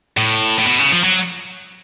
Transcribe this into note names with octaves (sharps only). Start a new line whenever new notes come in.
A2
A2
B2
C#3
F3
F#3